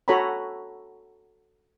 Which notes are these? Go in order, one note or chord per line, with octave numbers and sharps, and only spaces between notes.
F#4 A4 C#5 G#5 A#5 B5